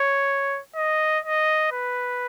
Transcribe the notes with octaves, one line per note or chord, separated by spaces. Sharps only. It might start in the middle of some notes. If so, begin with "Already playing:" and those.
Already playing: C#5
D#5
D#5
B4